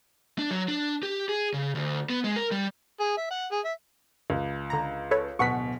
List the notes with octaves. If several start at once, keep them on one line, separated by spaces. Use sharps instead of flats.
D4
F#3
D4
G4
G#4
C#3
D2
B3
G#3
A#4
G3
G#4
E5
F#5
G#4
E5
C#2
D3 A#5
A4 B4 C#5
D1 B2 B3 F#5 C#6 B6